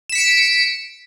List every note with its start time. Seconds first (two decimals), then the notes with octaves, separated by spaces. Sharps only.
0.09 E7
0.12 B6
0.15 C#7
0.18 D7